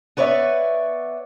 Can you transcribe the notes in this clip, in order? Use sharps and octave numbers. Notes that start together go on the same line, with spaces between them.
B3 B4 C#5 D5 E5